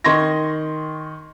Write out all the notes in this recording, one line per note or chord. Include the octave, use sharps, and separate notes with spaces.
D#3 D#5 C6 C#6 G#6 A#6